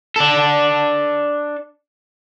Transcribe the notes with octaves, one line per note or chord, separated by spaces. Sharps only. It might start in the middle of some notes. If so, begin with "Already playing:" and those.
D4 A4